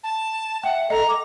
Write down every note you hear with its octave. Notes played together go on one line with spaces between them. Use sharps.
A5
E5 F#5 G5
A4 D#5 A#5
D6